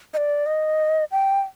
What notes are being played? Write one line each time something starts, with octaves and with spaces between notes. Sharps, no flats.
D#5
D5
D#5
G5